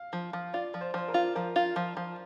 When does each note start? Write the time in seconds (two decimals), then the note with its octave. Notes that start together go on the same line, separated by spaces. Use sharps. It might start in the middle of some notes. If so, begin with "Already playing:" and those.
Already playing: F5
0.13 F3
0.33 F3
0.54 F4 D5
0.74 F3
0.81 C5
0.94 F3 C5
1.08 A#4
1.14 F4
1.35 F3 A#4
1.56 F4
1.76 F3
1.97 F3